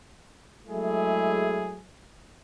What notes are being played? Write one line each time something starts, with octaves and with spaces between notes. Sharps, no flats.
F#3 G#3 A3 E4 G#4